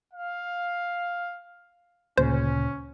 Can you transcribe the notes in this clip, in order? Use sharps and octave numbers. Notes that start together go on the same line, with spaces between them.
F5
D2 A#2 C#3 C#4 C5